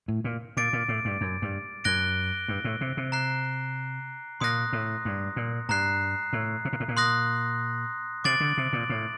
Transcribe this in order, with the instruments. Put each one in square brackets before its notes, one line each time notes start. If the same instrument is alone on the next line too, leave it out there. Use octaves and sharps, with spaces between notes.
[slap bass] A2
A#2
[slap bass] A#2 [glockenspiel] D6 A6 D7
[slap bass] A#2
A2
G2
F#2
G2
[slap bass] F#2 [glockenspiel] F#6 A#6 D7 G7
[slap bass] G2
A2
C3
C3
[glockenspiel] A#5 F#6 C7
[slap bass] A#2 [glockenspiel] C6 D#6 F#6 A#6
[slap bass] A2
G2
A#2
[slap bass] G2 [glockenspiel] A#5 F#6 C7
[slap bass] A2
C3
A#2
A2
A#2
[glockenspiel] C6 D#6 F#6 A#6
[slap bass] C3 [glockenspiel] D6 A6 D7 F#7
[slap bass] D3
C3
A#2
A2